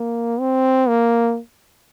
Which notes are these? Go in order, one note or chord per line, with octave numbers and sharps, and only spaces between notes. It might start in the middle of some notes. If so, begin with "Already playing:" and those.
Already playing: A#3
C4
A#3